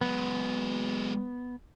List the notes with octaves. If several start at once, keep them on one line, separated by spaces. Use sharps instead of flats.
F#3 G#3 B3